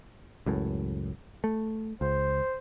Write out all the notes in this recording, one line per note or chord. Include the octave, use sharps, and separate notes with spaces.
C#2 F#2 A2
A3
C#2 C5